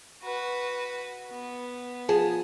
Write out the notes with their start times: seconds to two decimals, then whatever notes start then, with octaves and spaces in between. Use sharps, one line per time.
0.23 F#4 B4
1.31 B3
2.09 F3 G#4 A5